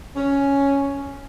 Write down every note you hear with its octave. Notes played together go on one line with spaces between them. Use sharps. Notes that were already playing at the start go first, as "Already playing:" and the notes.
C#4